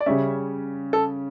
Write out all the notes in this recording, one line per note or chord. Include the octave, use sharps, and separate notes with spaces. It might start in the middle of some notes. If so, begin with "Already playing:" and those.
D5
C#3 G3 C#4 E5
A4